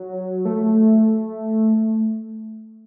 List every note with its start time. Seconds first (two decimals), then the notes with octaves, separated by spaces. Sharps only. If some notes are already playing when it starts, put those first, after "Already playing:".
Already playing: F#3
0.45 A3